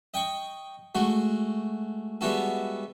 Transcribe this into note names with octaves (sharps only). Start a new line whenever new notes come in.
D#5 G5 C#6
G#3 A3 F#4
G3 G#3 B3 E4 F#4 A4